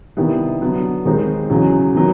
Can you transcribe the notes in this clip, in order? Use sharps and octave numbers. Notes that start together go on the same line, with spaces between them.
C3 D#3 G3 B3 E4
D3 F#3 B3
D#2 D#3 G#3 C4 D#4
E2 C#3 F#3
C3 D#3 F#3 B3